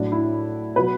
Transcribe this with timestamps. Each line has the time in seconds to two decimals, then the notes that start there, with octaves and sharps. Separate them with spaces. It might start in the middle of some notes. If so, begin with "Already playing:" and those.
Already playing: A2 F#3 D4
0.12 E4
0.75 B2 F#3 B4